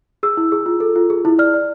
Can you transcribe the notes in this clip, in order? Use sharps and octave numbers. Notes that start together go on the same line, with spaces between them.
G#4 E6
E4
G#4
F4
A4
F4
G#4
E4
D5 F6
D5